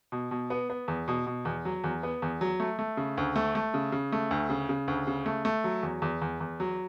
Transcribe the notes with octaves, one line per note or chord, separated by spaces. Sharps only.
B2
B2
B3
B3
E2
B2
B2
E2
F#3
E2
B3
E2
F#3
A3
A3
C#3
D2
A3
A3
C#3
C#3
A3
D2
C#3
C#3
D2
C#3
A3
A3
F#3
E2
E2
E2
E2
F#3